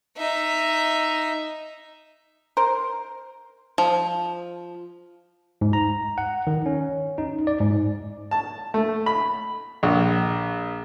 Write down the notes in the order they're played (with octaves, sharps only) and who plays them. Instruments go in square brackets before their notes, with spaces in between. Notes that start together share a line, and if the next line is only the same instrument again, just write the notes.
[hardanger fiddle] D#4 E5
[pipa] A#4 C5
[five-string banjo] F3
[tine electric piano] G#2
A#5
F#5
D#3
C#4
D#4
D5
G#2
[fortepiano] A5
A3
B5
A#1